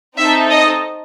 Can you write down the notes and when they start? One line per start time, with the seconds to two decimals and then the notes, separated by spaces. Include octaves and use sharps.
0.18 C4 D#4 A4 E5
0.50 D#5